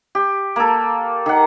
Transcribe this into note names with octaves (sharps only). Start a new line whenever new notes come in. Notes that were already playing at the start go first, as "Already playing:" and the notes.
G4
A#3 A4
D#3 F#5